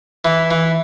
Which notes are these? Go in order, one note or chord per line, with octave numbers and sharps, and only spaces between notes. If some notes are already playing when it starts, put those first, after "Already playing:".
E3
E3